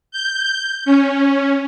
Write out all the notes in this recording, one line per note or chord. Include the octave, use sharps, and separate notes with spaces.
G6
C#4